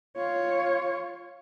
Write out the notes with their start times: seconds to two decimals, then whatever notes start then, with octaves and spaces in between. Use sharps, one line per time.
0.17 F4 C#5